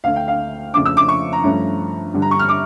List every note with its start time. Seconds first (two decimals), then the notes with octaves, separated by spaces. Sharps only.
0.04 D2 D3 A3 F5
0.16 G5
0.28 F5
0.73 F2 C#3 F3 A3 D4 D6
0.86 E6
0.97 D6
1.08 C#6
1.33 A#5
1.44 G2 F3 A3 C#4
2.14 G2 D3 G3 D4
2.22 A#5
2.31 C#6
2.39 F6
2.49 D6